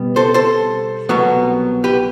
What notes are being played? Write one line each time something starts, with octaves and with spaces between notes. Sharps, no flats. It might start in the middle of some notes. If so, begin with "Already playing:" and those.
Already playing: B2 G3 B3
A4 C5
A4 C5
C2 B2 F#3 B3
G4 B4